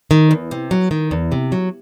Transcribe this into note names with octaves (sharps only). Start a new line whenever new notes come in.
D#3
E2
C3
F#3
D#3
E2
C3
F#3